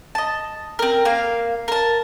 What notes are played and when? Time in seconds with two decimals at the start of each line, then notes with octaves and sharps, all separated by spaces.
0.15 D#5 A5
0.79 C4 A#4
1.05 A#3 F5
1.68 A#4 A5